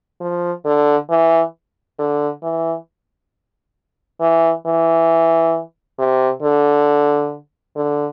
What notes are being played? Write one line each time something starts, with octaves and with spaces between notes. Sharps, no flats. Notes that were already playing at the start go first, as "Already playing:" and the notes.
F3
D3
E3
D3
E3
E3
E3
C3
D3
D3